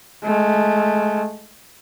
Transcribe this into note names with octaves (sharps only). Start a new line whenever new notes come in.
G#3 A3